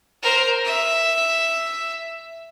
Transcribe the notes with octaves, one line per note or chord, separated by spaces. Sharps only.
A#4 C5
E5